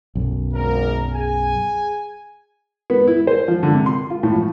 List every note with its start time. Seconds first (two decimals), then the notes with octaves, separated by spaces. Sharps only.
0.15 B1 F#2
0.54 G#1 A#4
1.14 G#4 G#5
2.90 B3
3.07 E4
3.27 C5
3.48 F3
3.63 D3
3.75 C3
3.86 C6
4.10 F4
4.23 A2
4.35 F3